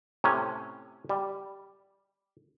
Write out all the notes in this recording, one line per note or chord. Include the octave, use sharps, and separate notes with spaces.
A2 C3 C#4
G3